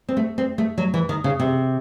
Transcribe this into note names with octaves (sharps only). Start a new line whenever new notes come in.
C4
A3
C4
A3
F#3
E3
D#3
C#3
C3